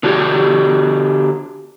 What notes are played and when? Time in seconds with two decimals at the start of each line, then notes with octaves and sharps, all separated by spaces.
0.03 D3 D4 F#4 G4